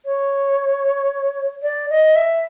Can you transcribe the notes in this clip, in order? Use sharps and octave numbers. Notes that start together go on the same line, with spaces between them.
C#5
D5
D#5
E5